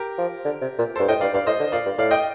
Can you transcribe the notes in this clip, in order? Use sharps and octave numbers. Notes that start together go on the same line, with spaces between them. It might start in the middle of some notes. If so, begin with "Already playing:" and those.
Already playing: G4 A#4
F3
D3
C3
A#2
G2 A4 C5
A2 D#5 G5
G2 D5 F5
G2 D5 F5
A2 C5 D#5
D3
A#2 D5 F5
G2
A2 D5 F5
D#5 G5